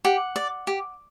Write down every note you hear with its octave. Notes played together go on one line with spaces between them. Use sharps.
G4 F#5
D5
G4